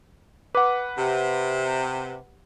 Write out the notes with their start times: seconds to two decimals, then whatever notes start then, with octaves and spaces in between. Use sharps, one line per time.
0.55 B4 F#5 D6
0.98 C3 G4 G5